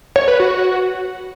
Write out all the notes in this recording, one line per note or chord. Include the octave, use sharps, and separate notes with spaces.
C#5
B4
F#4